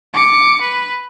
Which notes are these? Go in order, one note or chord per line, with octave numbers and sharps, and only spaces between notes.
D6 C#7
B4